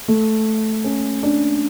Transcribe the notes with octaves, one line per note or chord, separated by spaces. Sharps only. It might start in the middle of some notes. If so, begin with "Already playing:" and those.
A3
C#4
D4